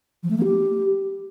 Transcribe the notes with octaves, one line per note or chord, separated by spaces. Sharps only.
F3
A3
A#3
G4